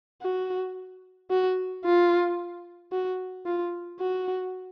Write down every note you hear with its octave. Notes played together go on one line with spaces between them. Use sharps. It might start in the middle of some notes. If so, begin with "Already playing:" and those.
F#4
F#4
F4
F#4
F4
F#4